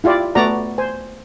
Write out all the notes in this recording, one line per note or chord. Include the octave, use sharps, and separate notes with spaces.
E4 F4 G4 D5
A3 B3 F#4 D5 A#5
C5 G#5